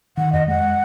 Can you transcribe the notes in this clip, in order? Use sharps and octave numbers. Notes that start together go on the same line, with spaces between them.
D#3 F#5
F2 D#5
G#3 F#5